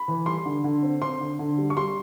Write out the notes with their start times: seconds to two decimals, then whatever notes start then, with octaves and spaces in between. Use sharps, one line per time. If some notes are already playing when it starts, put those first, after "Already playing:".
Already playing: B5
0.08 E3
0.26 G3 C6
0.45 D3
0.64 D3
0.83 C4
1.02 C4 C6
1.20 D3
1.39 D3
1.58 G3
1.70 C#6
1.77 G3 C6